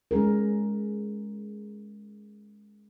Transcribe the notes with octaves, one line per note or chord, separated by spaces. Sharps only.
G#3 C#4 G#4 A#4